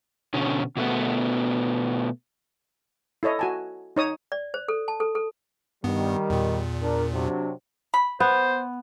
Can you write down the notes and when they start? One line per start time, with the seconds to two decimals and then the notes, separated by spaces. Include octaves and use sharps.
0.34 B2 D3 C#4
0.77 B2 A3 B3
3.23 E4 A4 C#5 D#5
3.39 F#4 G#5 A5
3.96 D#4 C#5 D#6
4.32 D5
4.54 C5
4.68 A4
4.88 A5
5.00 A4
5.15 A4
5.84 G2 D#3 G3 B3
6.30 E2 A#2
6.82 D4 A#4
7.13 C3 F#3 D4
7.94 B5
8.20 B3 C5